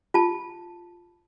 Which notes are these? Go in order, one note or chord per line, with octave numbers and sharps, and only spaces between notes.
F4 A5